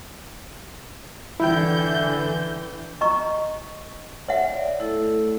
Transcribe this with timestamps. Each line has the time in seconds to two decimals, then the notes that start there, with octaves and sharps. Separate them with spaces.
1.40 D3 E3 E4 G5 G6
3.01 D#5 A#5 C#6
4.28 C#5 E5 F#5
4.49 D5
4.79 A3 E4 A4